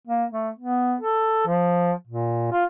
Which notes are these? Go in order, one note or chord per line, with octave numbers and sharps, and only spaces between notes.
A#3
A3
B3
A4
F3
A#2
F4